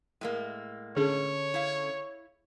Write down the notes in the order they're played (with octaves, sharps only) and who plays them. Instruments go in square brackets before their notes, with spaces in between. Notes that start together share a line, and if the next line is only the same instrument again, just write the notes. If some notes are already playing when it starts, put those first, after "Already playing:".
[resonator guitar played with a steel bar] A2 G#3 A#3
[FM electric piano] D3 C#4 A4 [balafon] G#4 [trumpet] C#5
[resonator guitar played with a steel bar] E4 F5